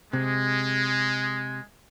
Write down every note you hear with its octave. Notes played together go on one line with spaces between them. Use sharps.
C3 G#3